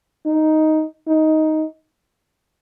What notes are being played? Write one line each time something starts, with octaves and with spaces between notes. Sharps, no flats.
D#4
D#4